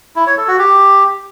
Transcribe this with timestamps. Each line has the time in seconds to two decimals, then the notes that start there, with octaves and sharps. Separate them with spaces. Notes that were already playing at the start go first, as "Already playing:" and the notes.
0.16 E4
0.27 C#5
0.37 A4
0.48 F#4
0.59 G4